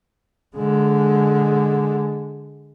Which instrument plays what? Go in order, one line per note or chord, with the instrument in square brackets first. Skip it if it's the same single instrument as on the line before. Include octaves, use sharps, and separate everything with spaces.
[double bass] D3 G#3